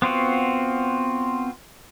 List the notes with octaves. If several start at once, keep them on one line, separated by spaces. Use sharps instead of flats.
B3 C4 F4 F#4